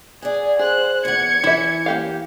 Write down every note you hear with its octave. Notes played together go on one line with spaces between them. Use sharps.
G#4 D5 F#5
G#4 C5 F#6
E2 F#5 G#6 C#7
E3 E4 E5
A#3 G4 F5